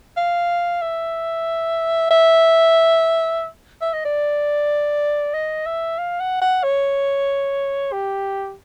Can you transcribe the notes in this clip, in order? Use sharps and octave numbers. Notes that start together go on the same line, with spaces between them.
F5
E5
E5
E5
D#5
D5
D#5
E5
F5
F#5
F#5
C#5
G4